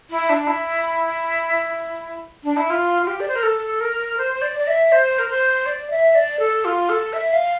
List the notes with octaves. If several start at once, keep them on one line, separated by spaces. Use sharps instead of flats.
E4
D4
E4
D4
E4
F4
F4
G4
D5
C5
A#4
A4
A#4
C5
C5
D5
D5
E5
C5
A#4
C5
D5
E5
D5
A4
F4
A4
E5
F5